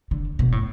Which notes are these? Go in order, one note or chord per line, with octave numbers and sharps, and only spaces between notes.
D3
B2
A2